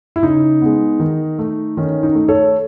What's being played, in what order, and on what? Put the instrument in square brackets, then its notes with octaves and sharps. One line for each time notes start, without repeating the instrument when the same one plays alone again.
[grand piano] E4
C#3 D#4
G#3 B3
D#3
A3
D#3 C#4
D#4
A3
A4 C#5